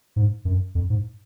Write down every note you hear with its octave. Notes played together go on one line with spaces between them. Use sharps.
G#2
F#2
F2
G#2